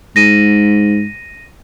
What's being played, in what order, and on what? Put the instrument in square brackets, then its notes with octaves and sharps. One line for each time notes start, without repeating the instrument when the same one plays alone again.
[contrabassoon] G#2 [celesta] A#6 D#7